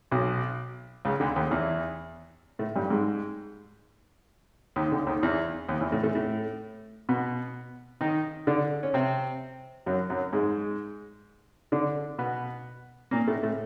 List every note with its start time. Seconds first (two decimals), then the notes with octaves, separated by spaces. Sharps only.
0.12 B1 B2
1.05 C#2 C#3
1.20 D2 D3
1.36 D#2 D#3
1.51 E2 E3
2.59 A2 A3
2.75 G2 G3
2.90 G#2 G#3
4.76 D#2 D#3
4.86 D#3
4.92 D2 D3
5.07 D#2 D#3
5.23 E2 E3
5.69 D#2 D#3
5.81 E2 E3
5.92 A2 A3
6.03 A2 A3
6.15 A2 A3
7.09 B2 B3
8.01 D#3 D#4
8.47 D3 D4
8.83 C#4
8.94 C3 C4
9.86 F#2 F#3
10.10 F#2 F#3
10.33 G#2 G#3
11.72 D3 D4
12.18 B2 B3
13.11 A#2 A#3
13.28 A2 A3
13.43 A2 A3